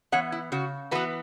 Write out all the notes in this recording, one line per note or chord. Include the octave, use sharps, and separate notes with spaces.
E3 B3 C#5 F#5
E4
C#3 F#4
E3 B3 F#4 B4